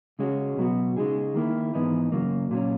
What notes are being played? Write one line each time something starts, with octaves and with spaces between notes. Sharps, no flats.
C#3 G#3 C#4 F#4
B2 F#3 B3 F#4
C#3 G#3 D#4 G#4
D#3 A#3 E4
G#2 E3 B3 D#4
F#2 C#3 F#3 A#3
A#2 F#3 C#4